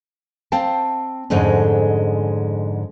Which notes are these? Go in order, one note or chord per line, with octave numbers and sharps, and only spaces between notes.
C4 F5 G5 A5
F2 G#2 D3 G#3 A3 C#4